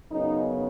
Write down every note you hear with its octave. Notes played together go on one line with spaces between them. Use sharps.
F#2 C#3 B3 D#4